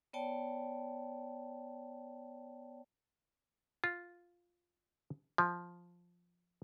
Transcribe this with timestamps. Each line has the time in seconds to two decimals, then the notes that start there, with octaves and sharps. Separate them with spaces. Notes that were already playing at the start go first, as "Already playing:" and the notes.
0.13 B3 C#5 D5 G5 A5
3.84 F4
5.38 F3